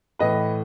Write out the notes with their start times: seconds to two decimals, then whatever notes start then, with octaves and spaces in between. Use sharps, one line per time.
0.19 A2 E3 B4 D#5